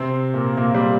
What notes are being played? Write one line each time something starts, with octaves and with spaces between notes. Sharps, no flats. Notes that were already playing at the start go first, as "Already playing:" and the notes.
Already playing: C3 C4
A#2 A#3
A#2 A#3
G3